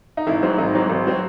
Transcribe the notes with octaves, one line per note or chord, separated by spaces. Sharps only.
D#4
G#1 E4
G#2 F#3 C4
G#1 D#4
G#2 F#3 C4
G#1
F#3 C4